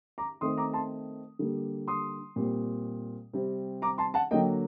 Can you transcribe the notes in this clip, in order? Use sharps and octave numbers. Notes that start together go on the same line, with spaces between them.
A#5 D6
D#3 A3 C4 C6 D#6
A#5 D6
A5 C6
D3 G3 A#3
C6 D#6
A#2 G3 C4
C3 G3 C4
A#5 D6
A5 C6
F#5 A5
D3 F#3 A#3 D#5 G5